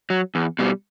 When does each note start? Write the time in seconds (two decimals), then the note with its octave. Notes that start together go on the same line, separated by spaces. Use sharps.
0.10 F#3
0.35 E2
0.59 B2 G3